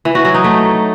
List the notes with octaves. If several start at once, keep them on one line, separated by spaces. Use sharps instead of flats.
E3
F#4
F#3
D#4
A3